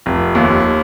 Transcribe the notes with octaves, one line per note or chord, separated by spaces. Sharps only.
F1
D#2